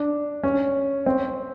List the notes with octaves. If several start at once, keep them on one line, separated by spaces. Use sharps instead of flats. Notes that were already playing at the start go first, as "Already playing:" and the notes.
Already playing: D4
C#4
C4